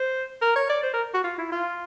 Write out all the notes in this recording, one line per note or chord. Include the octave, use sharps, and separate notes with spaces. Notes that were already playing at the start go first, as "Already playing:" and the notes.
Already playing: C5
A#4
C#5
D5
C5
A#4
F#4
F4
E4
F4